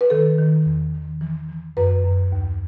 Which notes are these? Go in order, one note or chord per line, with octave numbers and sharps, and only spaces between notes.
B4
D#3 A4
D#3
E2
D#3
E3
E3
F#2 B4
F#2
D#2